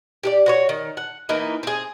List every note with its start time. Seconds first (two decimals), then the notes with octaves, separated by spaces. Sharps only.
0.23 G4 G#4 D5
0.46 F#4 B4 C#5
0.69 D#3
0.97 F#5
1.29 E3 A#3 D#4 E4
1.63 C4 G#4